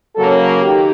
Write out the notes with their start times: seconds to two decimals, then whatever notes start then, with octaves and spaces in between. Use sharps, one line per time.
0.15 C#3 F#3 A#3 C#4 A4
0.63 D#3 G4